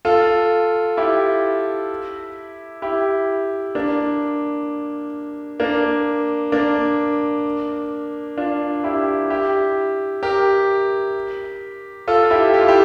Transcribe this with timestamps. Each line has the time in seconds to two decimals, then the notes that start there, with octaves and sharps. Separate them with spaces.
0.05 F4 A4
0.97 E4 G4
2.82 E4 G4
3.75 A#3 D4
5.60 A#3 D4
6.52 A#3 D4
8.37 D4 F4
8.84 E4 G4
9.30 E4 G4
10.23 G4 A#4
12.08 F4 A4
12.31 E4 G4
12.54 G4
12.61 F4
12.68 E4 G4